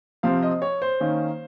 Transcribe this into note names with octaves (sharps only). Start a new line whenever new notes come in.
C3 F3 C4 F5
D#5
C#5
C5
D#3 A#3 C#4